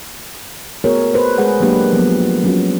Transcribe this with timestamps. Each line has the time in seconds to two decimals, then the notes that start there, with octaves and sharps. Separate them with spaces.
0.84 A3 B3 F#4 G#4 A#4 C#5
1.14 B4 C5
1.38 G#3 G#4 B4 F#5
1.60 F#3 G#3 A#3 D4 G4 B4
1.93 F3 F#3 B3
2.44 F#3 C#4 F4 F#4